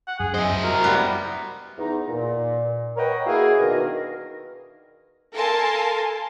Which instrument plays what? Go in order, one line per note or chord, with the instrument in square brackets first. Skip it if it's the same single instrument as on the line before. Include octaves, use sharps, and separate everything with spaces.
[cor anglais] F#5
[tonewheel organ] F#2 [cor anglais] G#4
[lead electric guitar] E4 C5 [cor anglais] D#5
[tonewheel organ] F#4 [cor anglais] A#4
[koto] G3 B3
[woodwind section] E2 D#4
A#2
A#4 B4 C#5 D#5 F#5 G5
A#3 E4 F#4 G#4 F5 G#5
B2 D#3 D4 A#4
[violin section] A4 A#4 F5 G#5 A5 C6